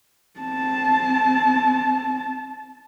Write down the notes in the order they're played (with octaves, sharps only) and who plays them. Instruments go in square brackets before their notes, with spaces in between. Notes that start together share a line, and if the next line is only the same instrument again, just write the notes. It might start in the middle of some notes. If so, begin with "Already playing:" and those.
[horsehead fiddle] C4 A5